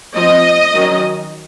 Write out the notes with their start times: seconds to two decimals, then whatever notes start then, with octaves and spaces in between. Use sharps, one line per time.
0.15 F3 C4 D#5
0.74 D#3 F#3 C#4